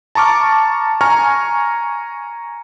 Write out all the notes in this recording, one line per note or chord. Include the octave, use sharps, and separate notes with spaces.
A5 A#5 C#6 D6 F6
G#5 A#5 C#6 F6